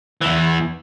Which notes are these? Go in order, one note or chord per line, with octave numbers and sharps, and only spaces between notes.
E2 E3